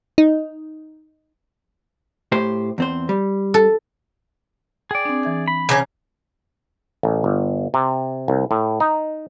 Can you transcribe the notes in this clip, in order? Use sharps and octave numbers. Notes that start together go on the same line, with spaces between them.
D#4
A2 G4 C5
E2 C4 C5
G3
A4
G#4 D5 G5
C4 D4
E3 E5 G#6
B5
C#3 C#4 A#5 D6 A#6
A1
G1
C3
C2
A2
D#4